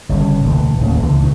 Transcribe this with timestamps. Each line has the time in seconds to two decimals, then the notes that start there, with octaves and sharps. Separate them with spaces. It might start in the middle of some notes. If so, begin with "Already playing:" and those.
0.09 G1 G2 C#3
0.44 E1 D2 D3 E3
0.77 D1 D#2 C#3
1.00 C#2 D3 E3
1.20 C#2 B2 G3 B3